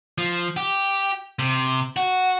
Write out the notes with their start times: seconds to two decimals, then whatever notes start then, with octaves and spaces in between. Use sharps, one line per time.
0.18 F3
0.57 G4
1.39 C3
1.96 F#4